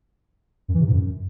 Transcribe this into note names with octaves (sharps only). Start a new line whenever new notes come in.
F#2
E3
C3
G#2
F#2